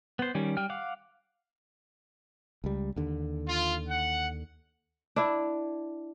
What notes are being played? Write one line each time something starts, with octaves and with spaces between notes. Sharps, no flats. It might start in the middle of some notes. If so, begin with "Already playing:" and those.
B3 C5
D#3 G3 C#4
G3 G5 F6
F5 F#5 D6
C#2 G3
D#2 D3
F4
F#5
D4 E4